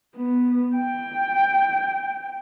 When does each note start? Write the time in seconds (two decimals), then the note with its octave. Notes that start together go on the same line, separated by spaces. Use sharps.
0.16 B3
0.76 G5